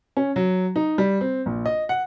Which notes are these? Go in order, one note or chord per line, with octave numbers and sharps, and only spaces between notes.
C#4
F#3
D#4
G3
C4
A#1
D#5
F#5